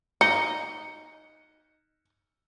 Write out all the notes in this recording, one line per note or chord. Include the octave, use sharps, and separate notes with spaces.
D#4 C#7